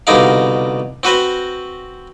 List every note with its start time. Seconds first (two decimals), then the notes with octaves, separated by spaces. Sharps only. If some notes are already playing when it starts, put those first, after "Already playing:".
0.07 C2 B2 D3 D#4 A#4 F5
1.03 C4 F#4 B4 C5